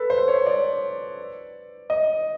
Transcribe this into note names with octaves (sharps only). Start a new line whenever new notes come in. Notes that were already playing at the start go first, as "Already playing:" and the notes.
Already playing: A4 B4
C5
C#5
D5
D#5